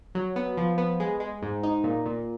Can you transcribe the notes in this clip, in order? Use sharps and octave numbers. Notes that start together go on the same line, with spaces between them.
F#3
B3
F3
B3
G#3
G#3
G#2
D#4
A#2
A#2